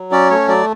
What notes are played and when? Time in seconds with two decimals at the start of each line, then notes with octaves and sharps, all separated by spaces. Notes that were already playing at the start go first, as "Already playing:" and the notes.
Already playing: F#3
0.11 C#4 D5
0.30 A3 C#5
0.48 F#3 D5